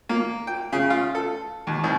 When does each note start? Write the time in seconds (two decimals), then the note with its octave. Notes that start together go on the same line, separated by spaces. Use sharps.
0.09 A#3
0.47 G5
0.72 C#3
0.90 F4
1.15 A4
1.67 D#2
1.84 C2